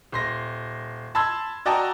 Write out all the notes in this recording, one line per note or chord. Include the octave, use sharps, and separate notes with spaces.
D#1 C6 A#6
A5 B5 C6 E6 G#6
F#4 D5 D#5 G5 A5 A#5